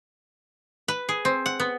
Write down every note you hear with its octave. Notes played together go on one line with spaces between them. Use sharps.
B4
G#4
C4
F#5
B3